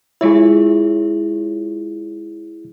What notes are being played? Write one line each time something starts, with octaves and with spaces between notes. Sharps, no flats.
G#3 E4 F4 G#4 C#5